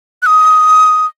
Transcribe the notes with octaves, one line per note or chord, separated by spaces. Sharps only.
F#6
D#6